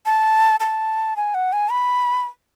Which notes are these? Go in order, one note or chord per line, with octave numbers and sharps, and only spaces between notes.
A5
A5
G#5
F#5
G#5
B5